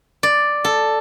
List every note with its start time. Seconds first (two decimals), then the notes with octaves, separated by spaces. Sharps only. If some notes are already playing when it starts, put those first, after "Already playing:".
0.23 D5
0.64 A4